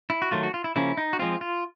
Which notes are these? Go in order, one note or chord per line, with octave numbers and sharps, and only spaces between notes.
E4
F#4
D#3 F#3 A3 F4
F#4
F4
E4
C#3 F3 A#3 C#4 E4
D#4
F#4
F3 G#3 C4 F4
F4